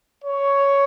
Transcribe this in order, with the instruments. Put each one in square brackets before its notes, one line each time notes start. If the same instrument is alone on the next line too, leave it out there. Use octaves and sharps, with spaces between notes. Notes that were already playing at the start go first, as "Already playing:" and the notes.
[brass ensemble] C#5